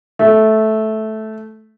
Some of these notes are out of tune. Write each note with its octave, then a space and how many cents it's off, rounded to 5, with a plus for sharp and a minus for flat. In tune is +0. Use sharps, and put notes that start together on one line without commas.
A3 -10